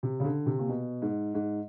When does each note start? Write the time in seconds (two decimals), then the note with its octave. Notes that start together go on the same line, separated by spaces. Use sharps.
0.03 C3
0.20 C#3
0.24 D3
0.46 C3
0.59 A#2
0.69 B2
1.02 G#2
1.35 G#2